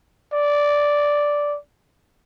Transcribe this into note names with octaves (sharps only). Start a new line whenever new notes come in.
D5